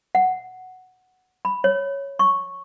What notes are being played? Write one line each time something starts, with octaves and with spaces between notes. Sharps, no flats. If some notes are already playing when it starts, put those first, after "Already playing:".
F#5
B5
C#5
C#6